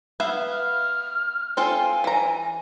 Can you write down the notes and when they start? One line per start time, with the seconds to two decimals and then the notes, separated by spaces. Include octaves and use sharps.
0.20 B3 E5 F5
0.52 F6
1.57 C4 F4 A4 G#5
2.04 E3 A#5